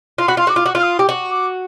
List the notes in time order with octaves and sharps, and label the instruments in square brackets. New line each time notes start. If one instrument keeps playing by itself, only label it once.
[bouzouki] F4 [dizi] C6
[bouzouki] F#4 [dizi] B5
[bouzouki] F4 [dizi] C6
[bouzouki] F#4 [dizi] D6
[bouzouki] F4
F#4
[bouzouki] F4 [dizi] F6
[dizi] D#6
[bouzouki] G4
F#4
[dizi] C#6
D6